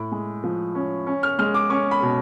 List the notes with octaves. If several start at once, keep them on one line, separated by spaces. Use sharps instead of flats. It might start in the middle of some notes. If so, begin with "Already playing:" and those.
Already playing: A2
G#3
F3
C#4
C#4
F6
G#3 F6
D6
C#4 C#6
B5
B2